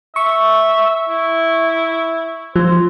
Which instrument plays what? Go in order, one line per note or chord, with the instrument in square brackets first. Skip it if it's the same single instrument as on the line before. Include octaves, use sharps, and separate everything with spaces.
[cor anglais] E5 [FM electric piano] C#6
[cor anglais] E4
[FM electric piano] F3 [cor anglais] C5